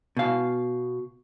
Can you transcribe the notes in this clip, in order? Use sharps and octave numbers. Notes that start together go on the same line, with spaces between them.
B2 F5